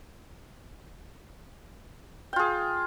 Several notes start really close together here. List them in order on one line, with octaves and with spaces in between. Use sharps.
G5 F4 G#4